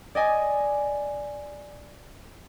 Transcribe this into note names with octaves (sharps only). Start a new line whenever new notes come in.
D5 D#5 G#5